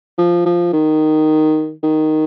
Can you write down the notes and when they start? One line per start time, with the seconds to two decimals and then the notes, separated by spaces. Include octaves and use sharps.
0.18 F3
0.46 F3
0.73 D#3
1.83 D#3